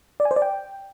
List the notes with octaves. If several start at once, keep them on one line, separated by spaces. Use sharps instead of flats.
D5
G#5
C5
D5
G5